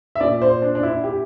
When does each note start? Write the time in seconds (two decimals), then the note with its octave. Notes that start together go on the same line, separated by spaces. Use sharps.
0.15 E5
0.21 A#2 D5
0.42 C5
0.62 D4
0.75 D4
0.83 E4
1.04 G4